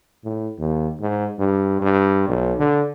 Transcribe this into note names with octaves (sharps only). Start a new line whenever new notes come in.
A2
D#2
G#2
G2
G2
B1
D3